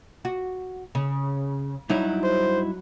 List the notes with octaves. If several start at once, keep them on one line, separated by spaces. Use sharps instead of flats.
F#4
C#3
G2 F#3 D#4 E4
C5